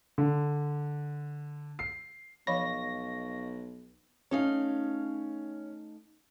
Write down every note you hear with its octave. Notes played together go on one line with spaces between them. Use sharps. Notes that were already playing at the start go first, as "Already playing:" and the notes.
D3
C7
B1 F3 C#5 D#5 F5 B5 C#6 A#6
A3 C#4 D#4 F5